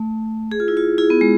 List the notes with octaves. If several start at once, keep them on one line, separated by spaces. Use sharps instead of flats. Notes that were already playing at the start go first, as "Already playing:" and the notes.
Already playing: A3
G#4
F4
E4
F4
E4 G#4
B3
G#3